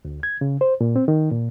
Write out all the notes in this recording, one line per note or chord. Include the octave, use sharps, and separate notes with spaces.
D2
G#6
C#3
C5
A#2
C4
D#3
A#2